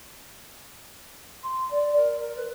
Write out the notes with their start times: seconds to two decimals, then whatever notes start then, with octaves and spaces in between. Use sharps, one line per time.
1.43 C6
1.70 D5
1.96 A#4
2.19 A#4
2.36 B4